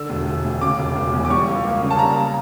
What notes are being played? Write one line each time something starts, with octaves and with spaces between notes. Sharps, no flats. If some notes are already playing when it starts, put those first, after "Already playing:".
Already playing: D3 E6
E1
E1
D2
C#3 D6
E1
E1
E2
D6
G3 C#6
C#2
A#3
C#3
A5
G3 A#5